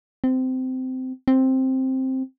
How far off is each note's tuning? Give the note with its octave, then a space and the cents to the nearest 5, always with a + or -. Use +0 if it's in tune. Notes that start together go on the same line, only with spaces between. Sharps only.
C4 -20
C4 +5